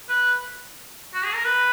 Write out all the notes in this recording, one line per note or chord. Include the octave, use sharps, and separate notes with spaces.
B4
F#4
G#4
A#4
B4